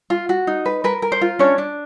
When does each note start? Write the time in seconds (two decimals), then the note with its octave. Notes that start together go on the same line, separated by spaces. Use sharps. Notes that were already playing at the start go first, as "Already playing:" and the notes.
0.10 F4
0.29 F#4
0.47 D#4
0.66 B4
0.84 A#4 B4
1.02 A#4
1.12 C5
1.21 F4
1.39 C#4 D4 C#5
1.58 D4